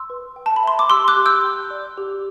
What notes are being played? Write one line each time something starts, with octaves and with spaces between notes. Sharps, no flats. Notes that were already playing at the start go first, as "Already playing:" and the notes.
Already playing: C6 E6
B4
G5
A5
B5
E5 C6
D6
G4 C6 E6
D6 F#6
G4
E6 G6
G5
D5
G4